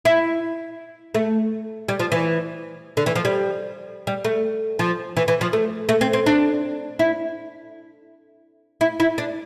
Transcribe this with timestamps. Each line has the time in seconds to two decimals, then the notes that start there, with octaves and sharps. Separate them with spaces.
0.05 E4
1.14 A3
1.89 G3
1.99 F3
2.12 E3
2.97 D3
3.06 E3
3.16 F3
3.25 G3
4.07 G3
4.25 A3
4.79 F3
5.17 E3
5.28 E3
5.41 F3
5.53 A3
5.89 A3
6.01 C4
6.13 C4
6.26 D4
6.99 E4
8.81 E4
9.00 E4
9.18 D4